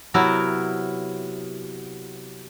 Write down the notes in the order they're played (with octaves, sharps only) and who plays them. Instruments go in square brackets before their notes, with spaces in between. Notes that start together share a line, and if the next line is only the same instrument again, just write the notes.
[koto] C3 F#3 B3 E4 A#4 E5